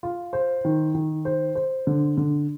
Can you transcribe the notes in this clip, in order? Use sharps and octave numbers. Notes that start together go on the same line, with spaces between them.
F4
C5
D#3
D#3
C5
C5
D3
D3